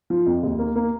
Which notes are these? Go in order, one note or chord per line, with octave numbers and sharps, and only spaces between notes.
F3
F2
D#2
A#3
A#3